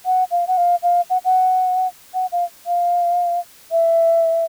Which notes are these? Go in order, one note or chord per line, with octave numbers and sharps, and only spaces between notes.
F#5
F5
F#5
F5
F5
F#5
F#5
F#5
F5
F5
E5